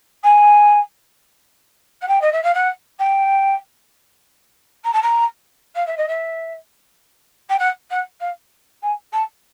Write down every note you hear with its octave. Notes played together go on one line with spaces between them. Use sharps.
G#5
F#5
G5
D#5
E5
F5
F#5
G5
A#5
A5
A#5
F5
E5
D#5
E5
G5
F#5
F#5
F5
G#5
A5